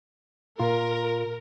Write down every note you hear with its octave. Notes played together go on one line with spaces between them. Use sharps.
A#2 F4 A#4